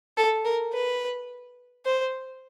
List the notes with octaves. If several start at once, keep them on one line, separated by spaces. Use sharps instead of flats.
A4
A#4
B4
C5